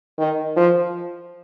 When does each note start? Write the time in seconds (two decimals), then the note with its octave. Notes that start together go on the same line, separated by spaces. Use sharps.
0.18 D#3
0.56 F3